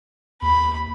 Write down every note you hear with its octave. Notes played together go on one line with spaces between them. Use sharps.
D#2 B5